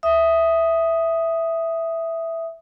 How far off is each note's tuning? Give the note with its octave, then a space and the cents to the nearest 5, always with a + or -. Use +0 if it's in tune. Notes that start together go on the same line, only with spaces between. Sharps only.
E5 +0 D#6 +0